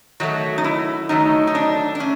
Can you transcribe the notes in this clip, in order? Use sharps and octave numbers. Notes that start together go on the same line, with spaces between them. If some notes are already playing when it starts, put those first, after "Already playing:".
D#3 F#3 A3 F#4
D#4
E4
D#3 F#3 A3 D#4
D#4
D4
D4
A3 C#4